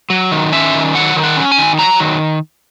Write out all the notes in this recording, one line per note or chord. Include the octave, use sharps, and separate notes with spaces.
F#3
D#3
C#4 E5
D#3
F#3 F#5
D#3
F#5
C#4
G#5
D#3
F#3 A#5
D#3